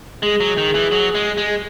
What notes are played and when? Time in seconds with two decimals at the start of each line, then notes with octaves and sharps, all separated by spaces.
0.23 G#3 G#4
0.40 F#3
0.58 D#3
0.75 E3
0.92 F#3
1.15 G#3
1.37 G#3